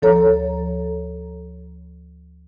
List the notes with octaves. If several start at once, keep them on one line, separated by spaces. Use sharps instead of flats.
D2 F3 A4 C#5 A#5